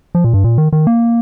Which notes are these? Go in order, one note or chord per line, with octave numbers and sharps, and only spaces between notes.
F3
A#2
G2
A#2
D#3
D#3
A#3